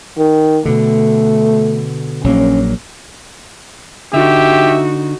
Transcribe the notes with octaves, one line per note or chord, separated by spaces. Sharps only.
D#3
B2 D3 A3
A#1 F#3 A#3 C#4
D3 D#4 F#4 G4 E5